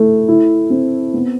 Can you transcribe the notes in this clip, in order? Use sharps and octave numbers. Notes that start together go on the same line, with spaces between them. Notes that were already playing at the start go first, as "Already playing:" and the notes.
Already playing: A3 E4
E4
C4
B3